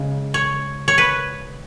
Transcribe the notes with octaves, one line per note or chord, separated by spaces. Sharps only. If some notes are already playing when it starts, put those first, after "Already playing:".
Already playing: C#3 G#3
C#5
C#5
B4